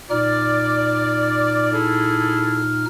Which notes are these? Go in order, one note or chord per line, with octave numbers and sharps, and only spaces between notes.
A#2 D#4 D5 F6
E4 G#4 A4